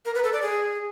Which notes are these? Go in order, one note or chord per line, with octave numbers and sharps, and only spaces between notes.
A#4
B4
A4
D5
G#4